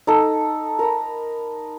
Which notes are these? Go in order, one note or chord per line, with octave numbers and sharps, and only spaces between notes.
D#4 A4
A#4 A#5 B5